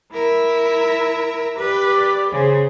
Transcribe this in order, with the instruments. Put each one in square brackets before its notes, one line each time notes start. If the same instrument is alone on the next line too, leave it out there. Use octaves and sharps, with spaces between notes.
[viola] E4 E5 [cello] A#4
[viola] G4 D5 [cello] B4
[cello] C#3 [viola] G#4 C5